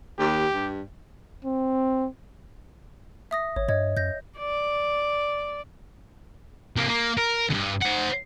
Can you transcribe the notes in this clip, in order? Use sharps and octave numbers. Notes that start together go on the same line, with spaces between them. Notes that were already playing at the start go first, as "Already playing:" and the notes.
D#2 G4
G2
C4
E5 D#6 A#6
G#1 C#5
G2 C#5 D#5 G#6
F#2 G6 A#6
D5
C2 A#3
A#3
A#4
D2 G2
C5 F#5